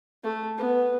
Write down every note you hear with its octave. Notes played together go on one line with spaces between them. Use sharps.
A3
B3